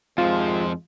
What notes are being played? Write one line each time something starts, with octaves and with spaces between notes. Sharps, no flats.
G#1 F2 C3 F3 G#3 F4